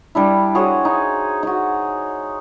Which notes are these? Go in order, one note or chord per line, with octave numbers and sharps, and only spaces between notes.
G3 D4 E4
F#4 G#4 C5 C#5
D#4
D#4 F#4